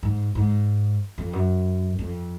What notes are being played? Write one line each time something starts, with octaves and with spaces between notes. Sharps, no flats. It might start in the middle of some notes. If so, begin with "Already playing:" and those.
G#2
G#2
F2
F#2
F2